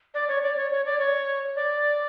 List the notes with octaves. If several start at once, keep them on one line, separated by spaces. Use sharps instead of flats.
D5
C#5
D5
C#5
C#5
D5
C#5
D5